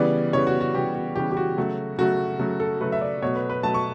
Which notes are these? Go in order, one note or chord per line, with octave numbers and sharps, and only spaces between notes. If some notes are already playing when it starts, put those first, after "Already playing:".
Already playing: C#3 E3 G3 B3 D5
C#3 E3 G3 B3 C#5
F#4
F#4
C#3 E3 G3 B3 G4
F#4
C#3 E3 G3 B3 G4
G4
F#4
C#3 F#3 A3
C#3 F#3 A3 F#4
C#3 F#3 A3
A4
C#3 F#3 A3 B4
E5
D5
B2 F#3 A3 C#5
B4
B4
B2 F#3 A3 A5
C#6